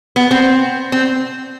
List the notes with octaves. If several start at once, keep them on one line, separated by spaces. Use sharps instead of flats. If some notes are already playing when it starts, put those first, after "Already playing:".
B3
C4
C4